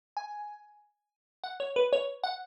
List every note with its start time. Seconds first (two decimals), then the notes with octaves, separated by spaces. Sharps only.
0.17 G#5
1.44 F#5
1.60 C#5
1.76 B4
1.93 C#5
2.24 F#5